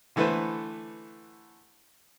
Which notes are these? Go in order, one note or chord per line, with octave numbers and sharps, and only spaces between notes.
D3 E3 A3 A4 B4 C5